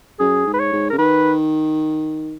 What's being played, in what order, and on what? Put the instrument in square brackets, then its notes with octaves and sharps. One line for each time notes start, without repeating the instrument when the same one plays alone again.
[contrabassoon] F#2 [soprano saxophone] G#4
[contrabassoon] G#2
[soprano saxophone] B4
C#5
[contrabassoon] G#2
[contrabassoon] C#3 [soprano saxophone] A#4
[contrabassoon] D#3 [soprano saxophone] B4